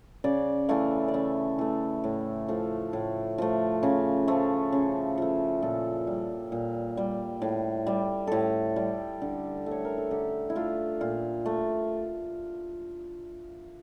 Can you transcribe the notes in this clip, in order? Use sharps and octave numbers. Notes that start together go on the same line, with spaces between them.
C#3 D5
E3 A3 F5
D5
C#3 E5
E3 A3
A2
F3 A3
A2
F3 A3
C#3 F5
F3 A3
C#3
F3 A3
A#2 A4
G3
A#2
G3
A2
G3
A2 G4 A4
G3
D3
A3
C#5
A#4
A4
D3 G4
E4
A3 F4
A#2 F4
A3